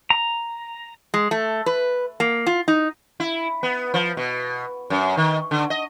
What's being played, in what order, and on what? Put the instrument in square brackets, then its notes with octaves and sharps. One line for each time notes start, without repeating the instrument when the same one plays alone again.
[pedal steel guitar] A#5
[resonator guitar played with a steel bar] G#3
A3
B4
A#3
F4
D#4
[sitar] E4
B3
F3
B2
F#2
D#3
D3
D#5